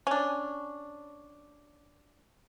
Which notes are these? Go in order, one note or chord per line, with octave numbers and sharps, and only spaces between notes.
C#4 D4